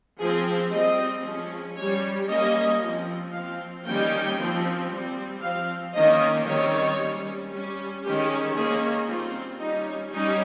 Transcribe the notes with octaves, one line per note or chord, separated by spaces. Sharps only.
F3 C4 G#4
G3 C4 D#5
F3 G#3 C#4
G3 C#4 C#5
G3 A#3 C#4 D#5
F3 C4
F3 C4 F5
D#3 G3 A#3 C#4 G5
F3 C4
G3 C4
F3 C4 F5
D#3 A#3 C#4 D#5
D#3 G3 C4 C#5
G3 C#4
G3 C#4
D#3 G#3 C#4 G4
D#3 A#3 C#4 G#4
G3 C4 F4
G3 C#4 D#4
G3 C#4 D#4